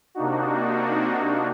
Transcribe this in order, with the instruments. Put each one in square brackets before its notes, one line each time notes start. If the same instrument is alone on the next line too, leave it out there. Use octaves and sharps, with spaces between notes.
[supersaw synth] C3 A#3 D4 D#4 F#4